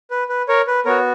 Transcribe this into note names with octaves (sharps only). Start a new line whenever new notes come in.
B4
B4
A#4 C#5
B4
B3 F#4 A#4 C#5